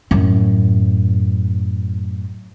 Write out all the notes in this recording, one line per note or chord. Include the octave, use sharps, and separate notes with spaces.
F#2 A2